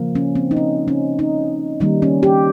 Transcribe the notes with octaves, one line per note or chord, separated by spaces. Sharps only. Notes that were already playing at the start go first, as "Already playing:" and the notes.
Already playing: C#3 F3 A#3
C#4
C4
D#4
C#4
C#4
D#4
D#3 G3 A#3 D#4
C#4
G4